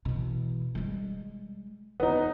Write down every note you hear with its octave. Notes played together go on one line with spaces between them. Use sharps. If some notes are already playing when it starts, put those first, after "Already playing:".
B2 E3
G3 G#3
E2 B3 D#4